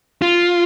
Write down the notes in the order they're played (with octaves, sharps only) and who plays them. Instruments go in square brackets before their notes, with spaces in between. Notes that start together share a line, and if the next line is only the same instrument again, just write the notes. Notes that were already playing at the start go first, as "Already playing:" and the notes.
[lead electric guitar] F4